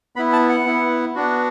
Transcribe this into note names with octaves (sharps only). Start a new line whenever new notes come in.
B3 E4 B5
A5
F#5
B3 E4
B3 D4 F#4